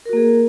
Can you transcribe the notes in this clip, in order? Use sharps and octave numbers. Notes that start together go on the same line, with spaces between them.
A#3 F#4 G#4 A#4